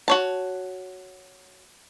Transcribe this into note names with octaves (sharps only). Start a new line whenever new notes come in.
F#4 C#5 A5